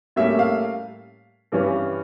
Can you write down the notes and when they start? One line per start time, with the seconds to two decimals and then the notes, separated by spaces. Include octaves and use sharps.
0.16 A2 G3 A#3 C#4 E5
0.39 F5
1.52 G2 E3 G3 C#4